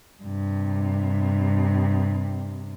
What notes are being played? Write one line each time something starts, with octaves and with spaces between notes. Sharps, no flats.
G2 C3